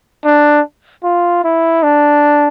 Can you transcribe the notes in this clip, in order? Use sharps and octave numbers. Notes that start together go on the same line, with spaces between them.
D4
F4
E4
D4